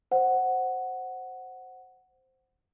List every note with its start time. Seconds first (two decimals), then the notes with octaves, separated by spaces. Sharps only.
0.11 C5 F#5